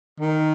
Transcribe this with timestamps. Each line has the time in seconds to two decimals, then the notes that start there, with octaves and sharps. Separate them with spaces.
0.20 D#3